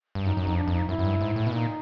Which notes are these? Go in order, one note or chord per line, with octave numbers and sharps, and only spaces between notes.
G2
F#2 D#4
F#2 D#4
F2
D4
F2 D#4
F#2 E4
F#2
G2
G#2
A2
B2
A#2 D#4